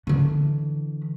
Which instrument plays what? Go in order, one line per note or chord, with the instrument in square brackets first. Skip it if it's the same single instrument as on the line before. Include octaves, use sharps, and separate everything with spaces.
[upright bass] D3 E3